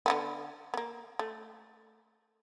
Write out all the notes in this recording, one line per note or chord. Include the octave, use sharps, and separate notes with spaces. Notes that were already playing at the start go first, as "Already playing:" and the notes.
D3 A3 B3
A#3 B3
A3